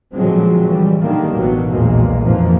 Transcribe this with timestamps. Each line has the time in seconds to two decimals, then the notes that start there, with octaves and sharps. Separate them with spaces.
0.13 A#2 D3 F3 F#3 G#3 C4
0.66 E3 G3
1.00 D3 D#3 G3 A#3
1.35 A1 B2 F#3
1.71 B1 E2 A#2 F3 G#3 A#3
2.20 G#1 F2 E3 F3 A#3